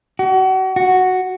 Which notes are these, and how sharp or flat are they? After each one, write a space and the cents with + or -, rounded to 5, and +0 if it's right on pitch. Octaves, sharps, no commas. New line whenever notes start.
F#4 +35
F#4 +0